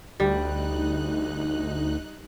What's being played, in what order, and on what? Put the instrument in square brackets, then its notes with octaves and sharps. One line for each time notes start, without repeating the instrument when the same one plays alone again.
[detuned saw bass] D2 [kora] G3 [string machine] D#4 F#6